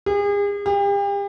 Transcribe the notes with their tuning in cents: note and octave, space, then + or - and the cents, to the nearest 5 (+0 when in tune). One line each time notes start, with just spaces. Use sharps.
G#4 -40
G4 +40